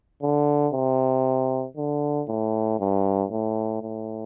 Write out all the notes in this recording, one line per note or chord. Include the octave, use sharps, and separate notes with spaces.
D3
C3
D3
A2
G2
A2
A2